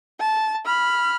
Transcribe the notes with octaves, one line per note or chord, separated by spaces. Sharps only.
A5
B5 F6